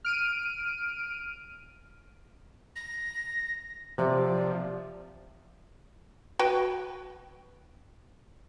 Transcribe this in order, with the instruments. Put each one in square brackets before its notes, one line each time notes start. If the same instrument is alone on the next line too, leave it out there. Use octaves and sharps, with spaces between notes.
[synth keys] F6 D7 D#7
[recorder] A#6
[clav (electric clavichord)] C3 [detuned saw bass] F3 [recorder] D5
[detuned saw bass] F3
[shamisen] F#4 B4 G5